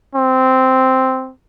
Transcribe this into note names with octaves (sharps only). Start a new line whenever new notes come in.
C4